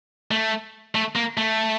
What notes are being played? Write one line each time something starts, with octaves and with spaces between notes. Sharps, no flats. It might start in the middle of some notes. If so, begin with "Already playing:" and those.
A3
A3
A#3
A3